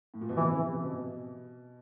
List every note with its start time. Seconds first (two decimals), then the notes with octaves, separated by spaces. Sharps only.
0.14 A2
0.21 A#2
0.29 B2
0.36 C3 E3
0.52 C#3
0.68 C3
0.83 B2